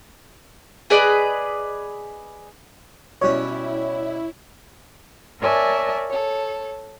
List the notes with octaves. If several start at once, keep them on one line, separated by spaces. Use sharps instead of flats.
G#4 B4 D5 D#5
B2 G3 C#4 E4 C#5
A#4 C#5 D5 E5 G#5 A5
A4 C#5